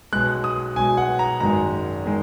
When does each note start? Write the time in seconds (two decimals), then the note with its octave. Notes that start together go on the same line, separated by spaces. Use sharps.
0.13 B1 B2 G#3 F#6
0.44 D#6
0.76 B1 B2 G#3 G#5
0.97 F#5
1.19 A#5
1.40 G#1 F#2 D#3 G#3 A#5
2.06 D#3 G#3